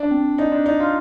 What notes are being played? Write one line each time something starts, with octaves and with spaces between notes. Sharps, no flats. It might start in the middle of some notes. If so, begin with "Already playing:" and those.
Already playing: D4 D5
C4
D#4 D5
D4
D#4 D5
F4